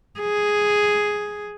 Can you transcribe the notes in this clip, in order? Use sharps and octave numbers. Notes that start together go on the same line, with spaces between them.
G#4